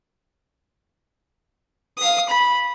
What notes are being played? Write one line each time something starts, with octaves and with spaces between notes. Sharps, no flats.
F5 D#6
B5